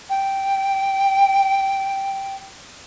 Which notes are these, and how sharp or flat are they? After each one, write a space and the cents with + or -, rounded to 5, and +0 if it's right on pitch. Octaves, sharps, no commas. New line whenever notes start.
G5 -5